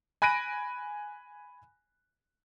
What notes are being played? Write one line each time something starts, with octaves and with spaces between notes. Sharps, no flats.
G#5 B5 F#6 A#6 D7 D#7